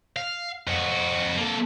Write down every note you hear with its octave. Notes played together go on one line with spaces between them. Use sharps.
F5
F2 F#4
A#3 A4